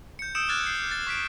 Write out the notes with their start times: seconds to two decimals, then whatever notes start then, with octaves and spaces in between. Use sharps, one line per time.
0.19 G6 C#7
0.35 D#6 E6 G6 C#7 D7 E7
0.48 D6 F6 F#6 G#6 A6
0.66 C7
0.91 A6
1.07 C#6 B6 D7